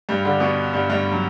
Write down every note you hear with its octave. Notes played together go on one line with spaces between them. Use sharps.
G2 G3
D3 D4
B2 B3
G2 G3
G2 G3
F#3